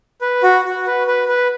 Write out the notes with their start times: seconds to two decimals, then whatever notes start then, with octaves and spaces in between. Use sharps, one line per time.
0.21 B4
0.43 F#4
0.65 F#4
0.87 B4
1.07 B4
1.28 B4